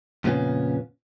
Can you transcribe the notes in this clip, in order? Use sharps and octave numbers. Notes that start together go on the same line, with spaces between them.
F2 A#2 C#3 B3 C#4